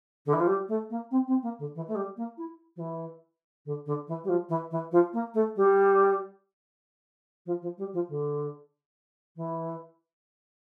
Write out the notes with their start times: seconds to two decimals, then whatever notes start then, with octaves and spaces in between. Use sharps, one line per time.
0.26 D3
0.33 E3
0.40 F3
0.47 G3
0.68 A3
0.90 A#3
1.11 C4
1.27 C4
1.42 A#3
1.59 D3
1.75 E3
1.88 A3
1.95 G3
2.17 A#3
2.37 E4
2.76 F3
2.80 E3
3.65 D3
3.86 D3
4.07 E3
4.24 G3
4.29 F3
4.49 E3
4.71 E3
4.91 F3
5.13 A#3
5.34 A3
5.56 G3
7.46 F3
7.62 F3
7.78 G3
7.93 F3
8.08 D3
9.36 E3